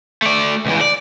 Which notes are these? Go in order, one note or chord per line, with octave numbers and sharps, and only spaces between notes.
A3 D5
C#2 E3
D5